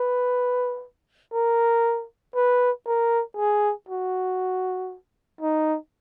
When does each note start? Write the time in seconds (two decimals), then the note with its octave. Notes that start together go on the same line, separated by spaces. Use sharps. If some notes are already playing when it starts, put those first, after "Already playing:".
Already playing: B4
1.33 A#4
2.35 B4
2.86 A#4
3.37 G#4
3.89 F#4
5.41 D#4